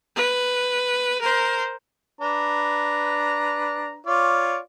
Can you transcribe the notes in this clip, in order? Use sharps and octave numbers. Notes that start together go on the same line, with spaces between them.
B4
A#4 C5
D4 B4 A#5
F4 C#5 D5